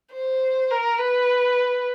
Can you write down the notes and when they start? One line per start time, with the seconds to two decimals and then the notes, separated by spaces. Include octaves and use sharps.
0.14 C5
0.70 A#4
0.98 B4